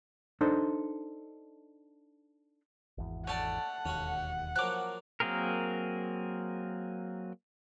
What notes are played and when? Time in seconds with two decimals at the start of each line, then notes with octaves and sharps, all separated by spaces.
0.41 D4 D#4 A4 C5
2.98 G#1 E2
3.27 A3 C#4 D5 F#5 A5
3.85 E1 D#2 C#4 F#4
4.56 F3 F#3 A#3 D6 F#6
5.20 F#3 A#3 C4 G#4 A#4